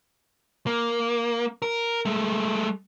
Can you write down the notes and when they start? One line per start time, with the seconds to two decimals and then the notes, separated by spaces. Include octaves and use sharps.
0.67 A#3
1.62 A#4
2.05 G#3 A3